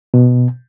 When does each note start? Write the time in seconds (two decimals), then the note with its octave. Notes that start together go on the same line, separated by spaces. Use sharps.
0.14 B2